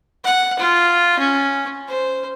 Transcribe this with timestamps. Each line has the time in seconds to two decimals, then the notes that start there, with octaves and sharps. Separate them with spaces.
0.24 F#5
0.59 F4
1.18 C#4
1.88 C5